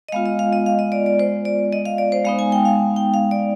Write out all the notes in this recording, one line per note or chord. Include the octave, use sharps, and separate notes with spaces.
D#5
G#3 B3 F4 F5
D#5
F5
D#5
F5
D#5
D5
D5
C5
D5
D#5
F5
D5
C5
G#3 B3 D#4 F5
G#5
G5
F5
G5
F5
D5